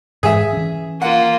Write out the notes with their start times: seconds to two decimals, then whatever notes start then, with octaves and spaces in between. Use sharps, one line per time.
0.23 G#2 E3 G#3 G#4 E5
0.53 E3 C#4
1.02 A#3 F4 F#5